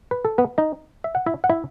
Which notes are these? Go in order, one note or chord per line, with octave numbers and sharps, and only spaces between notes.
B4
A4
B3 B4
D#4 D#5
E5
F#5
E4 E5
F#5
E4 E5